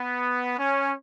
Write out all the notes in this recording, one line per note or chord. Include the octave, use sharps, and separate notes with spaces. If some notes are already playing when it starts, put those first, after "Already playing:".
Already playing: B3
C#4